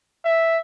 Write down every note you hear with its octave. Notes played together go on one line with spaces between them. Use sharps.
E5